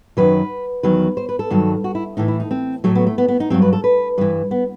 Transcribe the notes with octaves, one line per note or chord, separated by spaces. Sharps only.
F#2 D#3 F#3 B4
E2 D#3 F#3 B4
C5
B4
A4
G2 D#3 F#3
F#4
E4
A2 E3 D#4
E4
D#4
C4
A2 F#3 A3
B3
A3
B3
B3
D#4
G2 F#3 C4
B4
A4
B4
G2 E3 B4
B3